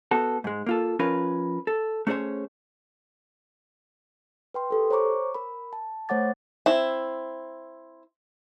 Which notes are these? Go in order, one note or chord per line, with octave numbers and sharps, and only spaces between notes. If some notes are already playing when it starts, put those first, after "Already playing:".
B3 F#4 A4
G#2 G#3
A#3 F4 A4
F3 C#4 F4 A#4 B4
A4
A3 C#4 G#4 A4 C5 C#5
B4 G5 C6
G4 A4 A#4
C5 C#5 A#5 C#6 D6
A#4 B5
A5
A3 C5 C#5 F#5 D6 A6
C4 E4